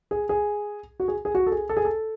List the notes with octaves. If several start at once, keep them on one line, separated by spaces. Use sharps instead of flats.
G#4
G#4
F#4
G#4
G#4
F#4
A4
G#4
A4
G#4
A4